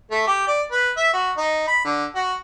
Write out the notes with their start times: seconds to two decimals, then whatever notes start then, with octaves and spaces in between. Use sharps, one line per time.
0.11 A3
0.27 G4
0.47 D5
0.72 B4
0.97 E5
1.13 F#4
1.37 D#4
1.67 B5
1.85 D3
2.15 F#4